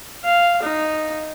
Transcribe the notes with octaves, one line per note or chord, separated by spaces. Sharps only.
F5
D#4